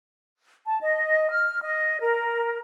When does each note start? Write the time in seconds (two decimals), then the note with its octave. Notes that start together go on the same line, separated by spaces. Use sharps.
0.65 A5
0.82 D#5
1.31 F6
1.61 D#5
2.00 A#4